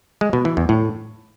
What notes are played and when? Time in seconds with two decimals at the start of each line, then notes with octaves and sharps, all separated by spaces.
0.21 G#3
0.33 B2
0.45 E3
0.57 E2
0.69 A2